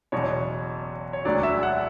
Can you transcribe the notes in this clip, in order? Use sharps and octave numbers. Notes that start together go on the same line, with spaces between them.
F#1 E2 B2 C#5
C#5
E1 D2 D3 F#3 D5
E5
F#5